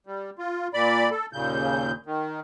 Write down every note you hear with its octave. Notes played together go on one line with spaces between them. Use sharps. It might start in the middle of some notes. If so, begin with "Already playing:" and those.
G3
F4
A#2 D5 B5
A4
D#2 A#2 C#3 G6
D#3